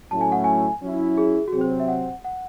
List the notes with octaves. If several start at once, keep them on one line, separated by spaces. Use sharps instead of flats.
A2 F#3 A3 C#4 E4 A5
G#5
F#5
G#5
F#3 C#4 E4
G#4
F#4
C3 F#3 C4 G#4
C5
E5
F#5
F#5